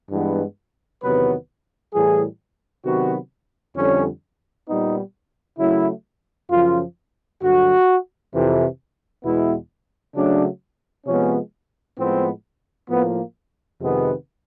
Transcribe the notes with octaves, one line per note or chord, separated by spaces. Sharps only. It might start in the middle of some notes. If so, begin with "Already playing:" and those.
G2 E3 G#3 B3
E2 C3 D#3 F#3 B3 B4
A2 E3 G3 G#4
C3 D#3 F#3 B3 F#4
F2 D3 G3 C#4
A#2 G3 B3 D#4
C#3 F#3 A3 E4
F#2 C#3 F3 F4
G2 D3 F#3 F#4
F2 C3 E3
E2 B2 G#3 B3 E4
C#3 F#3 A3 D4
C3 F3 G#3 B3 C#4
A2 F3 G#3 B3 C4
A2 F3 A#3 B3
F2 C3 D#3 G#3 B3